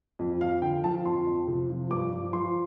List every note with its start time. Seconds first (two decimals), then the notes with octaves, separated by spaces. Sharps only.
0.19 F2
0.41 F2 F5
0.62 D3 G5
0.84 F3 A5
1.05 F2 C6
1.27 F2
1.48 C3
1.70 F3
1.91 G2 D6
2.13 F3
2.33 F3 C6